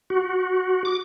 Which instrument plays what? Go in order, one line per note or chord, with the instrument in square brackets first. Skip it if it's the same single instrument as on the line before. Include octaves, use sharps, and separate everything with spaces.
[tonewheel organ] F#4
D6